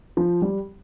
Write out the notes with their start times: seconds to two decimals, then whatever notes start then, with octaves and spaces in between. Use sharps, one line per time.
0.17 F3
0.42 G3